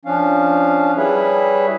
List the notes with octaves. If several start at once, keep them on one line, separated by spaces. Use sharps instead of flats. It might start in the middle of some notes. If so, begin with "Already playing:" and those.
F3 C#4 D4 F5
G3 E4 G#4 B4 C#5 E5